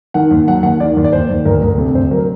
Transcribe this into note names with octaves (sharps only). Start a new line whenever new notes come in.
D#3 F#5
D#2
F#3 F#5
D#2 F#5
D#3 D5
D#2
D5
D#2 C5
D#2
D2 A#4
D2 A#4
C3 A4
D2 C5
F#3 A#4